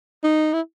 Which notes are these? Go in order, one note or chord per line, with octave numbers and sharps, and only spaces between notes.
D#4
E4